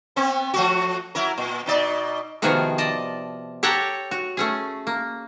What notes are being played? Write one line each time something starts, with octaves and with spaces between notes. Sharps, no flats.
B3 C4
F3 A3 F#4
F#3 E4 A#4
A#2
B2 D#4 D5
C3 D#3 F3 B3 F#4 G#4
D5 D#5 A5
G4 A4 C#5 F#5 G5 A#5
F#4
A3 C#4 G#4
A#3